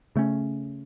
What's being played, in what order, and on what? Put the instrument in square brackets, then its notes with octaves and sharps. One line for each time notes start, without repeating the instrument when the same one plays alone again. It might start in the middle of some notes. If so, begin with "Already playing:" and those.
[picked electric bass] C#3 A3 C#4